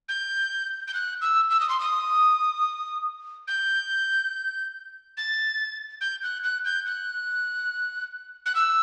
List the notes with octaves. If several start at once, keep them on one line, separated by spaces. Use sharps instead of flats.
G6
G6
F#6
E6
E6
D#6
C6
D#6
G6
A6
G6
F#6
F#6
G6
F#6
F#6
E6